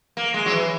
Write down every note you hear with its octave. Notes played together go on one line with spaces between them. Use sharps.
A#3
G#3
F#3
E3